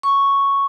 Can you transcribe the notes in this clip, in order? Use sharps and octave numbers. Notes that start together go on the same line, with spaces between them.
C#6